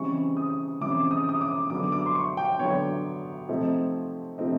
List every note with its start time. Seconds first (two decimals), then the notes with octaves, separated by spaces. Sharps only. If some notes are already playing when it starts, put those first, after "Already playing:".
Already playing: C#3 E3 G3 C4 D#4 C#6
0.37 D#6
0.81 C#3 E3 G3 C4 D#4 D6
1.11 D#6
1.29 D#6
1.41 D6
1.70 D3 F#3 B3 D6
1.92 D6
2.06 C6
2.15 C#6
2.37 G5
2.59 D3 F#3 B3 C#5
3.49 C3 F3 A3 C4 D#4
4.38 C3 F3 A3 C4 D#4